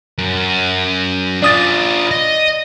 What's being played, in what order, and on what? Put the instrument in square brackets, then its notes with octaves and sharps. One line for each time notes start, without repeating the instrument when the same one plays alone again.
[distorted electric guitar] F#2
[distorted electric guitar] D4 F4 [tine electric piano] D5 D#6 A6
[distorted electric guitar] D#5